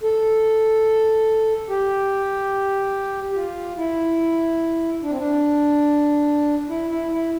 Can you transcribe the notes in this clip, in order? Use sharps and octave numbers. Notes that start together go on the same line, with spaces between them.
A4
G4
G4
F4
E4
D4
C4
D4
E4
E4
E4